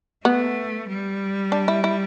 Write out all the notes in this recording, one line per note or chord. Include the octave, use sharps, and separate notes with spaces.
A3 B3
G3
D4
E4
E4